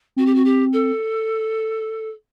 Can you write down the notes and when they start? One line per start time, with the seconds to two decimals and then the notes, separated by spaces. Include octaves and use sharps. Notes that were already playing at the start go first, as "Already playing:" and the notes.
0.16 C4 F#4
0.25 G4
0.34 F#4
0.45 G4
0.72 A4